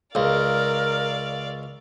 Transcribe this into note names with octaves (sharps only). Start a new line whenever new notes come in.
C#2 A#4 D5 F5